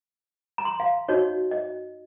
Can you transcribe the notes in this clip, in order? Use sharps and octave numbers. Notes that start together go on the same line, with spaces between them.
A#5
C6
F5
D#4 F#4 C#5 D#5
D#5